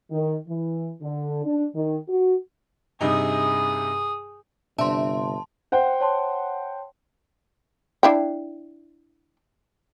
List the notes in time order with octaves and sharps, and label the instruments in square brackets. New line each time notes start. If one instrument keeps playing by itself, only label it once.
[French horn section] D#3
E3
D3
D4
D#3
F#4
[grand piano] G2 C3 D#4 [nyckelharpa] G#4 D#6
[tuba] G1 [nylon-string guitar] C3 E5 [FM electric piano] D4 [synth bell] A5 C6
[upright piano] C5 F#5 G5
[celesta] C#5 A5 C6
[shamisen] D4 E4 G5